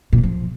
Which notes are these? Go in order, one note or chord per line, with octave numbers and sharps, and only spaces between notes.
A#2
D#3
F3